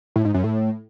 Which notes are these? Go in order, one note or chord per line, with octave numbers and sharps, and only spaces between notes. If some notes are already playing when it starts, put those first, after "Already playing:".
A2
G#2
F#2
A2